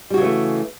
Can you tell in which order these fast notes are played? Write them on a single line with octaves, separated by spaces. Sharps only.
G3 F#4 C#3 E3 A3